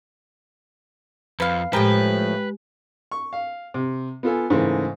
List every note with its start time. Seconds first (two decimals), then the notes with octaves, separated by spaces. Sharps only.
1.40 F2 B4 F5
1.73 A2 F3 G#3 G4 A#4 B4 G5
3.12 C#6
3.33 F5
3.74 C3
4.23 B3 F4 A4 G#5
4.50 G#2 C#3 E3 A3 A#3